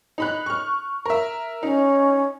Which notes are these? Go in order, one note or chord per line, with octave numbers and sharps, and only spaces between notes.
D#4 B5 F#6
C#6 F6
A#4 E5
C#4 D#4